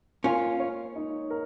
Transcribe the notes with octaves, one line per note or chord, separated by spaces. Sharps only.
A#3 C#4 F4
C#5
D#4
A#4